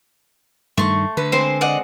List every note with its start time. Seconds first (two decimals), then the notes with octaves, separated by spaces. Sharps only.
0.78 G2 D#3 A3 C6 C#6
1.17 D3 B4
1.32 G#3 C4 C5
1.61 D5 D#5 F#5